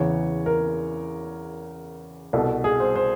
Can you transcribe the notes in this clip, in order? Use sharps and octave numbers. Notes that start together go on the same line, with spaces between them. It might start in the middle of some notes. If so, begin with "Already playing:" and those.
Already playing: E2 C#3 E3 C#5
A#4
C2 B2 A4
G#4
C5
C5